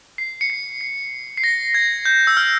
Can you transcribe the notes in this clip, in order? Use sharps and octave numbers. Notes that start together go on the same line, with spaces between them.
C7
C#7
C7
C7
C7
A#6
G#6
G6
E6
F6